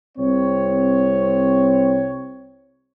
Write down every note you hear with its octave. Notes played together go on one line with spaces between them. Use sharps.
C2 C4 C#5